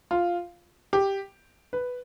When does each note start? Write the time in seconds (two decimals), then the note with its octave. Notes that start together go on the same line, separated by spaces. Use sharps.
0.11 F4
0.93 G4
1.73 B4